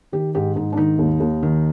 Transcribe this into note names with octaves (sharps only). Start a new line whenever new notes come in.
D#3 G4
G#2 G4
G#2 D#4
D4
D#3 D#4
D#2
D#2
D#3